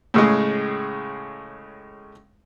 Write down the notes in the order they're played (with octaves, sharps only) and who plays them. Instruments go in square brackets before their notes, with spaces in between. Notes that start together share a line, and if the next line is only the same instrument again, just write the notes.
[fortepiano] A2 C#3 G#3